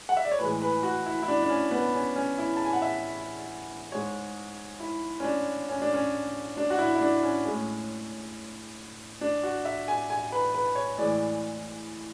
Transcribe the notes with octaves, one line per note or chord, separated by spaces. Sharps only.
F#5
E5
D5
C#5
A2 E3 G#3 B4
B4
F#4
E4
E4
D4
D4
C#4
B3
C#4
C#4
E4
A5
G#5
F#5
E5
G#2 G#3 C#5
E4
C#4
D4
C#4
D4
C#4
D4
F#4
E4
E4
D4
C#4
A2 G#3
D4
F#4
E5
G#5
G#5
B4
B4
C#5
A2 E3 G#3 D5